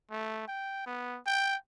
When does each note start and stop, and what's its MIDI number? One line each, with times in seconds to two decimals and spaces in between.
0.11 0.44 57
0.48 0.84 79
0.86 1.19 59
1.27 1.56 79